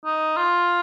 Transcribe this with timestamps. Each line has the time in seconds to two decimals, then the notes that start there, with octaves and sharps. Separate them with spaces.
0.06 D#4
0.37 F4